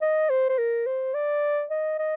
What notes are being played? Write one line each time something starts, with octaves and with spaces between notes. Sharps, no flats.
D#5
C5
C5
A#4
C5
D5
D#5
D#5